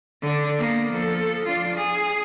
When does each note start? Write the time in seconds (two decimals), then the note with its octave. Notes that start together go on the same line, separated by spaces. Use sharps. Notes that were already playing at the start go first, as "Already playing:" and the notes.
0.22 D3 D4
0.58 A#3 B3
0.92 F3 A4
1.44 D4 F4
1.75 G#4